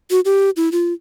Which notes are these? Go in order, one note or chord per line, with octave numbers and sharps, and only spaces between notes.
F#4
G4
E4
F4